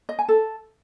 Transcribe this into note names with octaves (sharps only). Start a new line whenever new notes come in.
D#5
G#5
A4